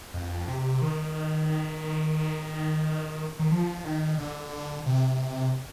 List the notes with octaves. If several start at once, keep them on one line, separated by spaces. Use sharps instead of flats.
F2
C3
D#3
D#3
F3
D#3
D3
C3